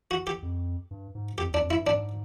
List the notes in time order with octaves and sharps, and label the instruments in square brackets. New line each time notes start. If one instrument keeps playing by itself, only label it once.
[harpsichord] F#4
G4
[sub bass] F2
G2
G#2
[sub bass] F2 [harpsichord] G4
[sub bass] E2
[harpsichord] D4
[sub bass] F2
[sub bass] G2 [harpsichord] E4
[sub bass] G#2 [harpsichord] D4